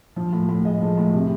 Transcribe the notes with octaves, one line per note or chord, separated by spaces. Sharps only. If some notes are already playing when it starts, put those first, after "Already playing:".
F3
A2
A2
G#3 D#5
F3
A2
C3